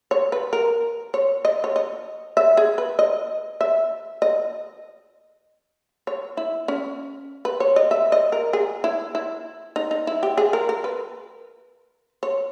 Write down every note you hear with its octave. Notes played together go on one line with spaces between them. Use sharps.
C#5
B4
A#4
C#5
D#5
C#5
D#5
E5
G#4
B4
D#5
E5
D#5
C#5
E4
C#4
B4
C#5
D#5
E5
D#5
A#4
G#4
E4
E4
D#4
D#4
E4
G4
G#4
A#4
A#4
B4
C#5